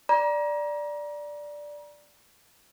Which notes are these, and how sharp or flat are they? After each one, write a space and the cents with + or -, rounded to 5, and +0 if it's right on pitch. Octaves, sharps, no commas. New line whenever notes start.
D5 +0 A#5 +30